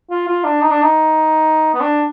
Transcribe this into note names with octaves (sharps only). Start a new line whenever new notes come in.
F4
F4
D4
D#4
D4
D#4
B3
D4